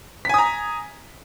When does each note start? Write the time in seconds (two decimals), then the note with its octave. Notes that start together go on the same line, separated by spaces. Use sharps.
0.25 B6
0.29 G#5
0.34 D#6
0.38 A#5